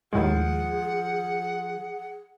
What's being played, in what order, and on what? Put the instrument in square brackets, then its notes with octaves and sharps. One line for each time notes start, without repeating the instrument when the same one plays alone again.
[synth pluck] D#2 A2 G#3 [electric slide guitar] F3 [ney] G#4 [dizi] F#5